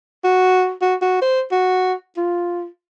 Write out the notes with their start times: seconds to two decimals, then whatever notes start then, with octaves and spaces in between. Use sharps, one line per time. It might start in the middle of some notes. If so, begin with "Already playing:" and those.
0.24 F#4
0.82 F#4
1.02 F#4
1.22 C5
1.52 F#4
2.17 F4